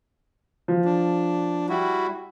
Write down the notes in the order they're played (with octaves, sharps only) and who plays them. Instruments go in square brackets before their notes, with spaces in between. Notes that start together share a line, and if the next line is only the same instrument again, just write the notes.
[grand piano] F3
[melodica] D4
G3 E4 F#4